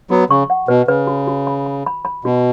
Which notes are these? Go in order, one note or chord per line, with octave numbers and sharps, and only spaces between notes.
F#3 B3 F#4
C#3 C#6
F#5
B2 B4
C#3 B4
F#4
F#4
B5
B5
B5
B5
B2 F#4